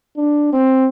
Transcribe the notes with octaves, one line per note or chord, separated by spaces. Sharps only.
D4
C4